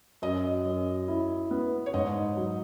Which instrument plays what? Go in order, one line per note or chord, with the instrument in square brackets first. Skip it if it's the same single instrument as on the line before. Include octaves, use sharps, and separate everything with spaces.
[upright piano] F#2 [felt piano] D#5
[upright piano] F#2
E4
B3
[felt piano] C#5
[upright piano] G#2 [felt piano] D#5
[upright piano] F#3